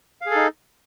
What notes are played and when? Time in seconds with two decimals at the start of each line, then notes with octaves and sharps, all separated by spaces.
0.21 F5
0.26 G#4
0.31 A4
0.36 D#4